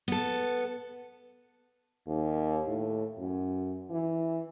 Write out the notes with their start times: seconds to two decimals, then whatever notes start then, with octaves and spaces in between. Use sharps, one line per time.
0.08 B3 A4
2.07 D#2
2.68 A2
3.19 F#2
3.90 E3